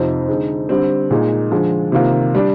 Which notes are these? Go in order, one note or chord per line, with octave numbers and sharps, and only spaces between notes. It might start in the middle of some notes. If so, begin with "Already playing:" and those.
Already playing: F2 C3 F3 C4 D#4
D3 G#3 C4 D#4
D3 G3 C4
A#2 G#3 D#4
D3 F3 G#3
C3 D#3 A#3 F4
G3 D4